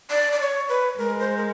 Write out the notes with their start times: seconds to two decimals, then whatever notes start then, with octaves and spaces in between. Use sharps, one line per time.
0.10 D5
0.33 D5
0.40 C#5
0.69 B4
0.98 G#3 A#4
1.19 C5
1.37 A#4